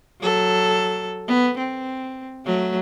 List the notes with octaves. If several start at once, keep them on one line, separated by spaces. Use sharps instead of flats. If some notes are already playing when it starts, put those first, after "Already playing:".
F#3 A4
B3
C4
F#3 A3